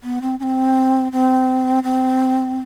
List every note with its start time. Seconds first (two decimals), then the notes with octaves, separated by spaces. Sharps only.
0.03 B3
0.22 C4
0.40 C#4
0.43 C4
1.12 C4
1.84 C4